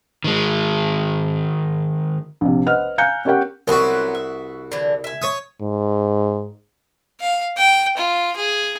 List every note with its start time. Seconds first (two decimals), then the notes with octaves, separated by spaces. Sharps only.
0.24 D#3 G#3
2.41 A#1 C3
2.66 B4 C5 D#5 F#5 F6
2.98 F5 G#5 A#5 F#6 G6 C#7
3.25 C#4 G4 A#4 C#5 F#5 G5
3.68 C2 F#3 B3 C4 F#4
4.15 E5
4.72 D3 E3
5.04 E5 G#5
5.22 C#5 C#6 D#6
5.61 G#2
7.21 F5
7.57 G5
7.97 F4
8.36 G#4